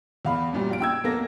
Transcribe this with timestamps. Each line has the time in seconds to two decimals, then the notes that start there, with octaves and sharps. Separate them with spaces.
0.25 E2 F5 B5
0.53 F#2 A#2 G3
0.69 A#1 F4 D7
0.80 G5 E6 G#6
1.04 B1 F2 A#3 A4 A#6